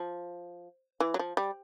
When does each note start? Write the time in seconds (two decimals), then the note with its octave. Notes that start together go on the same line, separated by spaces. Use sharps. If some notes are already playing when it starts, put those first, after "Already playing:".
Already playing: F3
1.00 E3
1.14 F#3
1.19 F3
1.37 G3